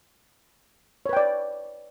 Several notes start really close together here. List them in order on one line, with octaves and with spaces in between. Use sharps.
C#5 B4 G5 D5